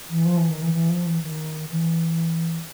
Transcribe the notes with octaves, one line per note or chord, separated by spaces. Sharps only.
E3
F3
E3
D#3
E3
E3
F3
E3
D#3
E3